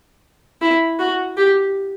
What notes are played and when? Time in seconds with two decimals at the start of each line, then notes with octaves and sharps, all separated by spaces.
0.61 E4
0.99 F#4
1.37 G4